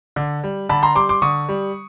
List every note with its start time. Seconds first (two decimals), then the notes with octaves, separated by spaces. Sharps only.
0.16 D3
0.44 G3
0.69 D3 A5 B5
0.83 A#5 C6
0.96 G3 C6 D6
1.09 C6 D6
1.22 D3 C#6 D#6
1.49 G3